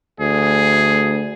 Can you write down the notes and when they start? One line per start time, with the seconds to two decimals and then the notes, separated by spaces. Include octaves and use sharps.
0.20 D2 G#4